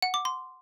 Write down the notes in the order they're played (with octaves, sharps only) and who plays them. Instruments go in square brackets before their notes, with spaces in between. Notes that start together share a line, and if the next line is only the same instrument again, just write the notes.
[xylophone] F#5
D6
C6